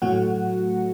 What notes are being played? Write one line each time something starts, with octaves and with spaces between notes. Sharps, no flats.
A2 F#3 A3 F#4 F#5